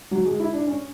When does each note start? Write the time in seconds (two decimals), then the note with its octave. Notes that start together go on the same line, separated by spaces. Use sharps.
0.11 F#3
0.25 G#3
0.40 E4
0.53 D4
0.67 C#4